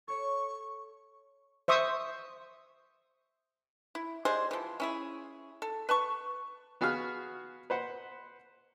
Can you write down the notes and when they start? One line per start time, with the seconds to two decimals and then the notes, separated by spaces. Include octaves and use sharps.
0.08 A4 C#5 C#6 C#7
1.68 C5 E5 C#6 D#6
3.95 E4
4.25 G3 G#3 G#4 C5
4.51 E3 F3
4.80 C#4 E4 G#4
5.62 A4
5.89 B4 A5 C#6
6.81 B3 F#4 G#4 F5 F6
7.70 B4 C5 F#5